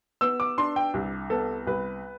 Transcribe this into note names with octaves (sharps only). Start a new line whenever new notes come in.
B3 E6
D6
D4 C6
G5
C2
B3 A4
C2 B4